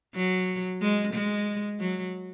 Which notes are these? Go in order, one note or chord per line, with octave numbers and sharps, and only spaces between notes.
F#3
G#3
G#3
F#3